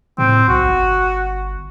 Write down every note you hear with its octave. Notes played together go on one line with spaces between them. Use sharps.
A2 C4
B1 F#4
G1